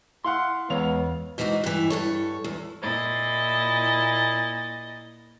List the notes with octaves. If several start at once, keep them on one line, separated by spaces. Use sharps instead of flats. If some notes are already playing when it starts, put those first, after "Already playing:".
E4 F5 F#5 C6
E2 G#3 B3 C#5 F5 F7
G#2 E3 A#3 D#4 F#4
G2 E3
G2 A4 C#5
E2
A#2 E4 D#5 A6